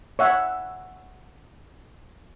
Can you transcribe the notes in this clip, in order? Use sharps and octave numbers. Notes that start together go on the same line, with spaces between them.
C#5 E5 F#5